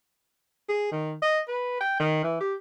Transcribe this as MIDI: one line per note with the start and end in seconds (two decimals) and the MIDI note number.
0.69 0.86 68
0.91 1.13 51
1.22 1.40 75
1.48 1.79 71
1.81 1.95 79
1.99 2.23 51
2.23 2.37 52
2.40 2.54 67